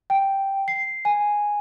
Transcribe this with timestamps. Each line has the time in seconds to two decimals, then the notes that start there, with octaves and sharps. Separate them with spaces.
0.10 G5
0.68 C7
1.05 G#5